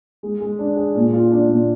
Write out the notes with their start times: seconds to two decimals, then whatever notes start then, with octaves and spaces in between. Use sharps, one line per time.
0.23 G#3
0.40 G#3
0.59 D4
0.76 G#4
0.95 A#2
1.13 F4
1.31 D4
1.49 A#2